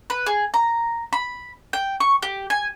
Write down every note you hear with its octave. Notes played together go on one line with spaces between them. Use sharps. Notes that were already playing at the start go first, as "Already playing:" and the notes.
B4
G#4
A#5
B5
G5
C#6
G4
G#5